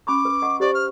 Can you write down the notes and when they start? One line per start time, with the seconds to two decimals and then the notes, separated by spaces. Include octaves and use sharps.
0.07 C#4 B5 C#6 D6
0.25 B4
0.42 D#5 F#5 C#6
0.60 G4 C5 D5 C#6
0.74 F6